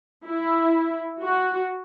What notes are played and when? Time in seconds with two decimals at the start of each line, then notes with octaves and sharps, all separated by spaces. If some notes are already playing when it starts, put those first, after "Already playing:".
0.25 E4
1.22 F#4